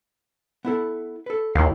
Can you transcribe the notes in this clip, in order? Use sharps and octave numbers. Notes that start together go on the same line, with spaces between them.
B3 E4 A4
A4 B4
D#2 E4 F5